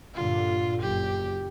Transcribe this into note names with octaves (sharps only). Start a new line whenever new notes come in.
G2 A#2 D3 F4
F#1 G4